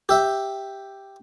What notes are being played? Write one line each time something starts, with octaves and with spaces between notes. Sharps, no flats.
G4 E5